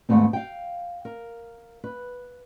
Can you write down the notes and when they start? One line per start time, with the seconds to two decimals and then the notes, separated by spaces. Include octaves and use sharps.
0.09 D#2 G#2 B2 A3 B3 C4
0.33 F5 G5
1.05 A#4
1.84 B4